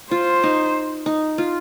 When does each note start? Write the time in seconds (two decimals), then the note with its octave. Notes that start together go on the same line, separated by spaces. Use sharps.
0.11 F4 C5
0.43 D#4
1.06 D#4
1.38 F4